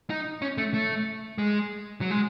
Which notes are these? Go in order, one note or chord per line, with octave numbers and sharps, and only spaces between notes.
D#4
C#4
A3
A3
G#3
F#3
G#3